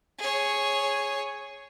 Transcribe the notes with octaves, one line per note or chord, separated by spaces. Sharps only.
G#4 C#5